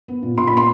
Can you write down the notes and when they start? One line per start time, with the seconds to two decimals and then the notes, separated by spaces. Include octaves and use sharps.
0.08 B3
0.22 A#2
0.37 A#2 C6
0.47 B5
0.52 B3 C6